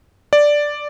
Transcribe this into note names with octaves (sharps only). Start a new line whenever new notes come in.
D5